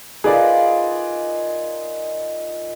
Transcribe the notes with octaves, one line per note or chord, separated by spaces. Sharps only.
D#4 F4 G#4 A#4 B4 D5